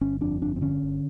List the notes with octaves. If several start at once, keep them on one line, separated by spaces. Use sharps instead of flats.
G1 C#4
F2 D4
G1 D4
C4
D3 C#4
G1